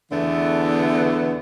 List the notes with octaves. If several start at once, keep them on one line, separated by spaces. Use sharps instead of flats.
E2 D3 E3 A3 B3